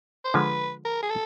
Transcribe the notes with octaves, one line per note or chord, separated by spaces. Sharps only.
C5
D3 F3 G#3 B4
A#4
G#4
A4